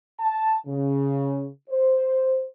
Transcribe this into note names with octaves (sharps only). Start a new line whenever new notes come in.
A5
C#3
C5